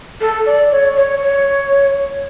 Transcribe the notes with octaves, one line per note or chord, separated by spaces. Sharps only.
A4
D5
C#5
C#5
C#5